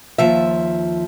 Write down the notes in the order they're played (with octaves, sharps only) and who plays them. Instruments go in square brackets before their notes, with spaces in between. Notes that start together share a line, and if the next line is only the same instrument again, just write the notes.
[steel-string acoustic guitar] D#2 F3 E5